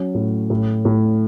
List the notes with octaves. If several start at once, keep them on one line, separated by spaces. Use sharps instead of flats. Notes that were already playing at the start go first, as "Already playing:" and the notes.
Already playing: F#3 C#4
A2
A2
A2